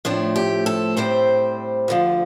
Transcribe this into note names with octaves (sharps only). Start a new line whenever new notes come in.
A2 F3 A3 C4 D4
G4
A4
A2 G3 C4 C5
D2 D3 F3